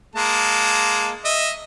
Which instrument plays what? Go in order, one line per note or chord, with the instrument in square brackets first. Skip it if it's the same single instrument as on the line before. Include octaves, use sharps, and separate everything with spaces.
[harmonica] G#3 A#3 A5
D#5 E5